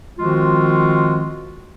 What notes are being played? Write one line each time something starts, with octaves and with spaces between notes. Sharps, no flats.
D#3 F3 G#3 C4 F4 F#4